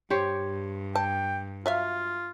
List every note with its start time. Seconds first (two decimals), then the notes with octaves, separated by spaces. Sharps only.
0.10 G2 G4 C5 C#5
0.95 G5 A5
1.66 F#3 F4 E5 F5